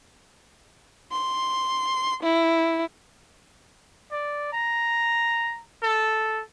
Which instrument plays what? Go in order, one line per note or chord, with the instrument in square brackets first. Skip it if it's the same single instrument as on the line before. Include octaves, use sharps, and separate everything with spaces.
[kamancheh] C6
E4
[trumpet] D5
A#5
A4